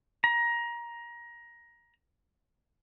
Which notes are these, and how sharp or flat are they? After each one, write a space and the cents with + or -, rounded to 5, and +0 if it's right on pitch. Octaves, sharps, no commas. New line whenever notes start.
A#5 +20